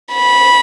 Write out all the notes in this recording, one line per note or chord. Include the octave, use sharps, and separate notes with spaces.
B5